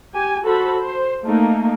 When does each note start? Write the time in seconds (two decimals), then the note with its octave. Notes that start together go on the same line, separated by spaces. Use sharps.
0.14 G4 G#5
0.45 F#4 A4 C5 B5
0.81 C5
1.24 A3 A#3 D#4